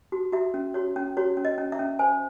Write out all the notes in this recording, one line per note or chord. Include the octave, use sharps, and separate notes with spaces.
F#4
F#4 E5
C#4
F#4 C#5
C#4
F#4 C#5
C#4
D#5
C#4
E5
C#4
C5 G#5